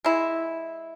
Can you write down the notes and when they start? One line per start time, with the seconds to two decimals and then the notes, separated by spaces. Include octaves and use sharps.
0.05 G#3 E4